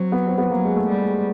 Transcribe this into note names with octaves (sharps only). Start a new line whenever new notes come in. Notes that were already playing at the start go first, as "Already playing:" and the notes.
Already playing: F#3 C4
B3
C4
B3
F#3 A#3
G#3
A3
G3
G#3